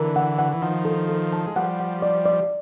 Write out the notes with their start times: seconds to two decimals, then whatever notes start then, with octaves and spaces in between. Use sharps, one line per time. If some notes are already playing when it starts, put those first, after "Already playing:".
Already playing: D3 E3 A#4
0.16 F#5
0.39 F#5
0.53 E3
0.62 D#3 F3 F#5
0.85 A4
1.09 A4
1.33 A5
1.46 G#3
1.56 F3 G3 F#5
1.80 F#5
2.02 D5
2.26 D5